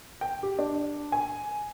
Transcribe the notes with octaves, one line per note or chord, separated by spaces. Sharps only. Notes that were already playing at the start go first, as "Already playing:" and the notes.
G5
G4
D4
G#5